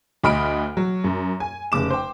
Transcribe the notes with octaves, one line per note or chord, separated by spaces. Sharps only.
D2 D#5 B5 F6 D7
F#3
F#2
G#5
F1 C#3 D6 E7
C5 G5